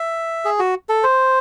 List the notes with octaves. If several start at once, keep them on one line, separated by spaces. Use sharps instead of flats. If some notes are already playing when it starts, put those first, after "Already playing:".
Already playing: E5
G#4
F#4
A4
C5